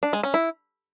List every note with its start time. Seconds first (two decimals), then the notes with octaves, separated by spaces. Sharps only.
0.03 D4
0.13 G#3
0.24 C#4
0.34 E4